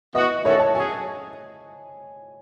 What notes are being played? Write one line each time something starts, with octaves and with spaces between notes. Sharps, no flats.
E3 B3 F#4 D#5
D#3 A3 C#4 F#4 A4 C#5
A5
F#3 C#4 G#4 G#5